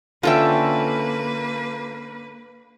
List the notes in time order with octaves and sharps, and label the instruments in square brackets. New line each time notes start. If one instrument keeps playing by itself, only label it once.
[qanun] D3 C#4 G5 [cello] A#3 B4 [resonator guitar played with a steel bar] F4 A4 E5